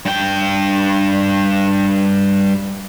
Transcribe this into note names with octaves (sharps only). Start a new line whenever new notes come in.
G2 G5